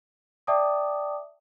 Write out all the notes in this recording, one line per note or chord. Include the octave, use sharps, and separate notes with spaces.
D5 E5 G5 A5 D6 D#6